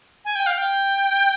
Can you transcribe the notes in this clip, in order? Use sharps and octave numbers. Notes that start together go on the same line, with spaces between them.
G#5
G5
F5
G5